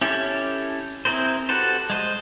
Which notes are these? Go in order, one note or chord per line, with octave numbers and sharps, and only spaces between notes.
C#4 E4 G4 A4
C4 E4 G#4 A#4 C5
F#4 G4 A4 B4 C5
G#3 C5 D#5